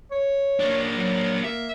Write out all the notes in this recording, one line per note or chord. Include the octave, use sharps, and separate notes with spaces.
C#5
A#3 D4
F#3
A#3 E5